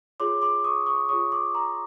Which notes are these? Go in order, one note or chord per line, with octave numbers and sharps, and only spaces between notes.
F4 G#4 C#5 C6 D6
C6 D6
C#6 D#6
C#6 D#6
F4 G#4 C#5 C#6 D#6
C6 D6
A#5 C6